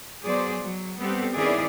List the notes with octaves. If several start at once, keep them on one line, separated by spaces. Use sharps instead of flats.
F#3 B3 G#4 C5 D5
F#3
G3 B3 C4 G4 A4
D#3 B3 C#4 E4 G#4 D5